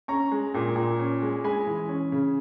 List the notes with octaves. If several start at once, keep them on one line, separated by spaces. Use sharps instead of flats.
C#4 A#5 C#6
G#3
A#2
A#2
C#4
G#3
G#3 G#5 B5
E3
C#4
C#3